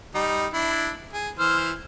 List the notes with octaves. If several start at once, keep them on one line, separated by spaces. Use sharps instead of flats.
G3 D#4
D4 E4
G#4
E3 C5 F6